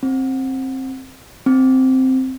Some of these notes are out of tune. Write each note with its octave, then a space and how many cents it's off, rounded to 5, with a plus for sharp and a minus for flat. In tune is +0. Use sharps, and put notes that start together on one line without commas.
C4 +15
C4 +0